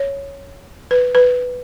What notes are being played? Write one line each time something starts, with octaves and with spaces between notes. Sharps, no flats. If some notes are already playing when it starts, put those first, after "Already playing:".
Already playing: C#5
B4
B4